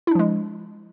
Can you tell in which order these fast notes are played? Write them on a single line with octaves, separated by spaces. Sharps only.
E4 D4 F3 G#3